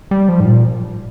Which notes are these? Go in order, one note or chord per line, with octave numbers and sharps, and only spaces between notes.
G3
F3
G#2
A#2